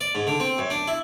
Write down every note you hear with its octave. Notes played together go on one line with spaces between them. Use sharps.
D5
G#2
D3
C4
F#2
D4
E4